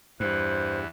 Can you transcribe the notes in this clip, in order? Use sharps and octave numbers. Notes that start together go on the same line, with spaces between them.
E2 G2 E4 C5 F#6